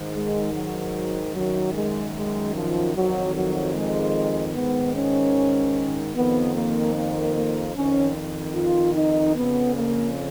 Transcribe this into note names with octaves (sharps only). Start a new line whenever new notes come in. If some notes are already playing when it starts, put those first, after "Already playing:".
Already playing: G#2 D#3
G#3
F#3
F#2 D#3 F#3
G#3
G#3
F3
F2 D#3 F#3
F#3
G#3
G#2 D#3 B3
C#4
F2 D#3 B3
A#3
A#3
A#3
F2 D#3 C#4
F4
D#4
F2 C#3 B3
A#3